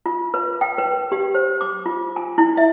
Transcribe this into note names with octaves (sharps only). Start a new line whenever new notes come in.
F4
B4
G5
B4
G4
C5
D6
F4
G#5
E4
E5